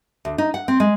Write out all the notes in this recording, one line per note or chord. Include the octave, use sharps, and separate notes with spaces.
D2
D#4
F#5
C4
G#3